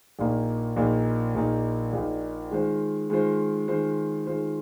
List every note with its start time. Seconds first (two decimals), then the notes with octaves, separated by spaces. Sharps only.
0.19 A#1 A#2 A#3 D#4
0.76 A#1 A#2 A#3 D#4
1.35 A#1 A#2 A#3 D#4
1.93 A#1 A#2 A#3 D#4
2.51 D#3 G#3 F4 C5
3.10 D#3 G#3 F4 C5
3.68 D#3 G#3 F4 C5
4.26 D#3 G#3 F4 C5